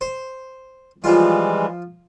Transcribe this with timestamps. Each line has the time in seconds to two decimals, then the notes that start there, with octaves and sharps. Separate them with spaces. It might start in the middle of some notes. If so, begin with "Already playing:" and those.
0.01 C5
1.04 E3 F3 G3 G#3 F4